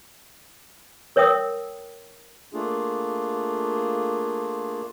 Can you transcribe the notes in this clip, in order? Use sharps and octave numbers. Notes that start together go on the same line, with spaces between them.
A#4 C#5 E5 G5 D#6 E6
A3 A#3 D4 F4 G#4